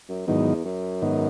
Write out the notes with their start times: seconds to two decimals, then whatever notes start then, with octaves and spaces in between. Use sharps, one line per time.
0.09 F#2
0.27 E2 G#2 D#3 F#3 B3 D#4
0.65 F#2
1.02 G#2 D#3 F#3 B3 D#4